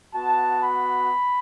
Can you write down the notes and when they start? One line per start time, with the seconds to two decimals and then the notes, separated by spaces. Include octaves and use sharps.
0.14 B3 F#4 A5
0.62 B5